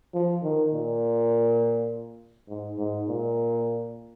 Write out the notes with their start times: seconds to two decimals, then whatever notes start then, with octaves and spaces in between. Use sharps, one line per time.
0.14 F3
0.43 D#3
0.73 A#2
2.49 G#2
2.78 G#2
3.08 A#2